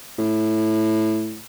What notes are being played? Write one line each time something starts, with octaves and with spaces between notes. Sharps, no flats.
A2